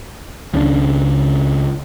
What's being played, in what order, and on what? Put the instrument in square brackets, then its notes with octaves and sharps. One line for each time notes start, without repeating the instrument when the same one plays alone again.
[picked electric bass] C#2 C#3 F#3 D4